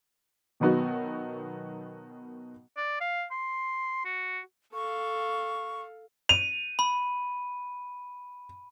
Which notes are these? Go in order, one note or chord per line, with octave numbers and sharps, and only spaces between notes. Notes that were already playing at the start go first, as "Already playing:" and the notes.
B2 D#3 F#3 B3 D#4 F#4
D5
F5
C6
F#4
A4 F5 C#6
D#7 F7
B5